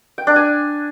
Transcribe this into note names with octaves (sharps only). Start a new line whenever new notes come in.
G5
D4
G#5